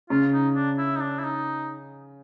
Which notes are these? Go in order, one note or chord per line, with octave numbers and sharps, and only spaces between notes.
C#3 F4
D#4
D4
E4
D#4
D4
E4
D#4